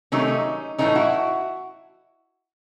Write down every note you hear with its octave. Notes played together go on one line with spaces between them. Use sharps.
C3 D#3 F#3 A3 C#4 D#4
A2 E3 A3 C#4 D#4
E4 F#4